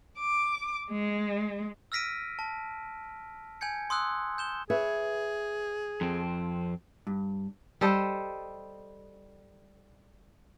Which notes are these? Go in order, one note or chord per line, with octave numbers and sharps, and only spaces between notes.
D6
G#3
E6 F6 A#6 B6 D7 D#7
A5
G#5 G6 G#6 C#7
C6 D#6 E6 F#6
G6 E7 G7
G#4 B4 C#5 E5
F2 C4
G2
G3 A4 C5 D#5